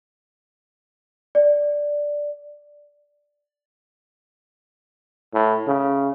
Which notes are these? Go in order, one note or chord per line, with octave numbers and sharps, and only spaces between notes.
D5
A2
C#3